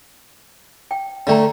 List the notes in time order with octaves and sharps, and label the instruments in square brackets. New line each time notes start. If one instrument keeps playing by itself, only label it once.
[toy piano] G5
[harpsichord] D3 A3 [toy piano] D5 G5 A#5